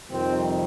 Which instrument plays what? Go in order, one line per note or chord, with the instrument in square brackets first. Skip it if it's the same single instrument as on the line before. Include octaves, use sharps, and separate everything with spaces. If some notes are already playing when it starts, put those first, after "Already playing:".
[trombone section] F2 C3 D#3 G3 C4